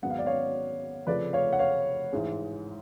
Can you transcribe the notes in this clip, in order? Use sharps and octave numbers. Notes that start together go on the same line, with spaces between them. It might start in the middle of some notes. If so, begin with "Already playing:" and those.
G#1 G#2 F#3 B3 F#5
F5
D5
C#5 F5
F1 F2 C#3 F3 A3 B4 D5
C#5 F5
F#5
C#5 F5
A1 G#2 G#3